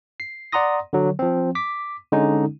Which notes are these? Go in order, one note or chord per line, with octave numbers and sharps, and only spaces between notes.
C7
D5 F#5 A#5 C6 D#6 A#6
D3 F#3
F3 C4
D6 B6
D3 G#3 C#4 D#4